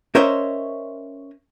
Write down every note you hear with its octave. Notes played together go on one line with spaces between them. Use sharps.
C#4 A#4 C5 C#5 D#5 E5